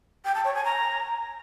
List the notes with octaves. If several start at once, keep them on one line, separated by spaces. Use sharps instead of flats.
G5
A5
C#5
G#5
A#5